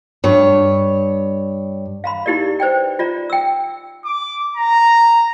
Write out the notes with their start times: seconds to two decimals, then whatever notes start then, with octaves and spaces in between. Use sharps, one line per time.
0.24 G2 C#5
2.04 F5 A#5 B5
2.26 D#4 E4 G4 A#4 D5
2.60 B4 C5 D5 G5
2.99 F4 D5 A#5
3.30 G5 E6
4.05 D6
4.57 A#5